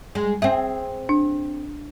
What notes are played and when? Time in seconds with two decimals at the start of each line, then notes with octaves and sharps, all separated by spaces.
0.15 G#3
0.42 C4 G#4 E5
1.09 D4